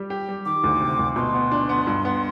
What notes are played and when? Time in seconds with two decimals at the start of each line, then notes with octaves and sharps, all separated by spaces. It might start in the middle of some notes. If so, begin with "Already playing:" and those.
Already playing: G3 G4
0.10 G4
0.29 G3
0.45 D#3 D6
0.64 D2
0.81 C3
0.99 D2
1.16 B2 C6
1.34 B3
1.51 D4
1.69 B3
1.87 G2
2.05 B3